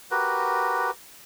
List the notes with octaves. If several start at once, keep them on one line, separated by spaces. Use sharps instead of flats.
F#4 G4 A#4 B4